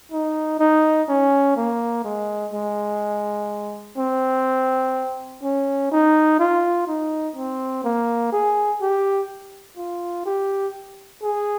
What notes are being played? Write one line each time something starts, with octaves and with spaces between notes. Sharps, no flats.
D#4
D#4
C#4
A#3
G#3
G#3
C4
C#4
D#4
F4
D#4
C4
A#3
G#4
G4
F4
G4
G#4